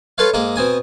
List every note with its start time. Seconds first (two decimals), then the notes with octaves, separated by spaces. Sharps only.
0.18 F4 A4 B4 C#5 F5
0.34 G#2 A#3 G#4
0.56 B2 C4 G#5 D#6